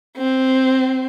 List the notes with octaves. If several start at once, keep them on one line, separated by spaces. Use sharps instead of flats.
C4